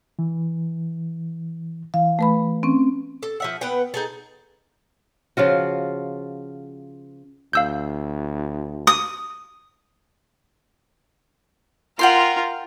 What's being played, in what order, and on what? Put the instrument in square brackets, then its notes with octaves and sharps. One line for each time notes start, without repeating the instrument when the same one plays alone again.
[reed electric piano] E3
[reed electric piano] E3 [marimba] F5
[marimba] A3 B4 B5
C4 C#4
[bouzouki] A4
F3 E5 F#5
B3 B4 F#5 G5
D#4 G#4 A4
[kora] C#3 F3 F4 F#4
[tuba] D2 [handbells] F5 E6 G6
[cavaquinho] D#6
[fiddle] F4 A#4 [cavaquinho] F#5 G5 C6